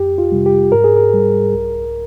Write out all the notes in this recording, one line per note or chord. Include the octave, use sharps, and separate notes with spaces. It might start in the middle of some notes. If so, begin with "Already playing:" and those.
Already playing: F2 G4
F4
C3 G3
G4
G#2 A#4
G#4
A#4
G3
C2